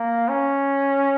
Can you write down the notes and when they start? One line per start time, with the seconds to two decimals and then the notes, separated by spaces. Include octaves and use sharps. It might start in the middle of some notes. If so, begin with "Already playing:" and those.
Already playing: A#3
0.28 C#4